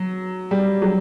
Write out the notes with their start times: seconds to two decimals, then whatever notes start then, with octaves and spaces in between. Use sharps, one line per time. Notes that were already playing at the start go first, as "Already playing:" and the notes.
Already playing: F#3
0.51 G3
0.82 F#3